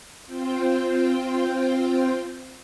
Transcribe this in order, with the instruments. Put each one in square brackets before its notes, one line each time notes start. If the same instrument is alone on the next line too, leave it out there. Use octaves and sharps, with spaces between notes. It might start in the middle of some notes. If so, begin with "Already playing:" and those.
[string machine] C4 F4 C5 G5